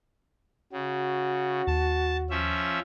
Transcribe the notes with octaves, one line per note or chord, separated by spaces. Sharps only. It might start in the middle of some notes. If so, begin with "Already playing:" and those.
C#3 F#4
D#2 A5
F3 C#4 E5